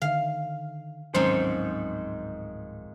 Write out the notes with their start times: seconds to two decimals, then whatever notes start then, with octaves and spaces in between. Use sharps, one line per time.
0.02 D3 D#3 F5
1.14 D1 F2 G#2 D#3 F#3 C#4 C5